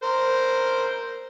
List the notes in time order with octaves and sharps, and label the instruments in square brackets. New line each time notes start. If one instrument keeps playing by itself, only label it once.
[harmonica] A#4 C5